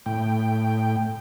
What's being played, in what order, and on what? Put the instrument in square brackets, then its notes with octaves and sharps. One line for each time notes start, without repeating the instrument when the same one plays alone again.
[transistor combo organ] A2 G5